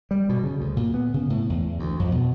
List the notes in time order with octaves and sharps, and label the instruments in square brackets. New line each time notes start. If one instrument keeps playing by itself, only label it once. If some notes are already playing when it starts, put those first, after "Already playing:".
[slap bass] G3
B2
C#3
D2
A#2
B3
C#3
A2
E2
D2
F2
B2